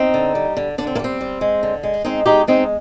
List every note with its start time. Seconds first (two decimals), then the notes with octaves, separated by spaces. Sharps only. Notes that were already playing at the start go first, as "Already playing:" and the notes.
Already playing: C4 D#4
0.14 D3
0.35 G3
0.57 D3
0.78 D3 D4
0.87 C4
0.95 A#3
0.99 G3 C4
1.21 G3
1.41 G#3
1.63 D3
1.83 G#3
2.05 G#3 C4 D#4
2.26 G#3 D#4 G4
2.47 G#3 C4 D#4